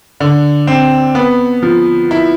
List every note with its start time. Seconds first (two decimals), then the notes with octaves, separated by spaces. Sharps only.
0.20 D3
0.67 C4
1.15 B3
1.63 F3
2.11 E4